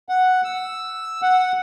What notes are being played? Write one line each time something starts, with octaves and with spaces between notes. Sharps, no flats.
F#5
E6
F#5